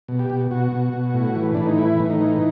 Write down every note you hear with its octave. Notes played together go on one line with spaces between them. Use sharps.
B2
G4
B2
B2 F#4
B2
B2
A2
E3
A2 D4
D#4
E3 E4
A2
D#4
E3